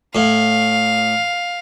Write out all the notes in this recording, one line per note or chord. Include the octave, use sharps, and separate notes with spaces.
A2 F5